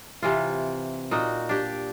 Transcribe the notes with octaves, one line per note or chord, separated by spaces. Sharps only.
C3 E3 F4
A#2 D#4 F#4
D4 G4